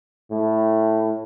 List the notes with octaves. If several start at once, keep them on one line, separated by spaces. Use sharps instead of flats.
A2